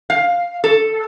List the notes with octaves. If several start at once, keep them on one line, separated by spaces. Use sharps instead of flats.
F5
A4